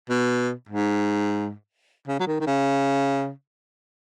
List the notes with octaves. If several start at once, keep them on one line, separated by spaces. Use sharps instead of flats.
B2
G#2
C#3
F#3
D#3
D#3
C#3